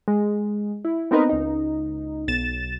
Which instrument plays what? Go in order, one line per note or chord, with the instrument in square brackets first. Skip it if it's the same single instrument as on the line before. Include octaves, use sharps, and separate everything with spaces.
[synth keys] G#3
E4
B3 C4 D#4 A#4 B4 D#5
C#2 D#4
B1 A6 E7